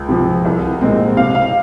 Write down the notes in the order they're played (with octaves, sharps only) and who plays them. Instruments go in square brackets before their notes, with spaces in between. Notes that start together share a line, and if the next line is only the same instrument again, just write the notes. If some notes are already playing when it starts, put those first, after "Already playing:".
Already playing: [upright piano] C#2
C3 F3
C2
A#2 G#3 C4
C3 F5
F5